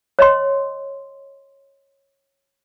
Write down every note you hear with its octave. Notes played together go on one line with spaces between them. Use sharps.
C#5 D#5 C6